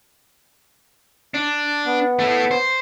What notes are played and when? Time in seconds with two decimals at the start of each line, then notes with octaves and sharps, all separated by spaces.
1.34 D4
1.86 B3
2.19 A3 E4
2.51 C5